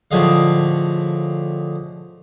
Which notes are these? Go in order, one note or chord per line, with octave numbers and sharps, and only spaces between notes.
A2 D3 F3 G#4 D#5 F5